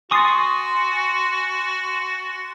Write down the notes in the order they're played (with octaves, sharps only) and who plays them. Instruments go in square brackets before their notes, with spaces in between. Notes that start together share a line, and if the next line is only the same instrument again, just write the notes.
[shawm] F#4 [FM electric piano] G#5 C6 A6 [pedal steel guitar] C#6 D#6